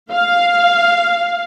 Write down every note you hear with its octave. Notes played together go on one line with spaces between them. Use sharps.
F5